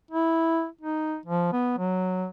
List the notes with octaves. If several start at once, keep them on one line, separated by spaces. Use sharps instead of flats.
E4
D#4
F3
B3
F#3